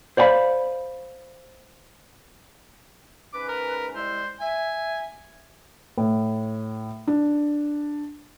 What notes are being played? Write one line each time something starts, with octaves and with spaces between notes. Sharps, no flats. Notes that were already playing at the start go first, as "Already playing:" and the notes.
C5 D5 F5 G#5 B5
G#2 C#4 B4 D6
A#4
G3 G#3 E4 C5
E5 G#5
A2
D4